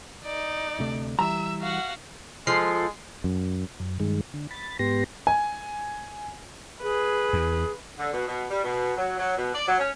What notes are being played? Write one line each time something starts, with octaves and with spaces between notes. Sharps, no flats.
D#4 D5
D2 C3 A3
E3 G3 E5 A#5 E6
F#4 F5 F#5
F3 G#3 A4 C7
F#2
F#2
G2 D#3 G#3
D3
B5 A6
G#2 B3 G4 C6 A#6
G#5
G#4 B4
E2
D3
B2
B2
G3
B2
F#3
F#3
B2
D5
F#3
C#4